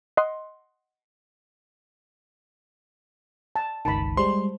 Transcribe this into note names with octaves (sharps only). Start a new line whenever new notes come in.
D#5 F#5 C6
A5
G1 C#2 D#3 A5 B5
G3 G#3 C5 C6